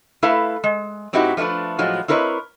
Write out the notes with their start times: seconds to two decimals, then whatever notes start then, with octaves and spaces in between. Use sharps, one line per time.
0.23 A3 E4 A4 B4 E5 F5
0.64 G#3
1.13 A2 C4 D#4 E4 F#4 G4
1.37 F3 G#3 A3 D4 B4
1.79 A2 F3 F#3 G#3
2.08 C4 E4 A#4 B4 C#5 D#5